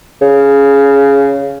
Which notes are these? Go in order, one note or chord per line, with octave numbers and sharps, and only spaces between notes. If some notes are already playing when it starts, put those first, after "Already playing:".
C#3